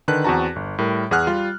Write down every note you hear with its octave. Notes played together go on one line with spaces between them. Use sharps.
D3 D#3 B4 A5 F#6
E2 C4 F#4 A5 A#5
G1
A2 G3 A#4
E2 G#4 F#5 F6 F#6
G3 F4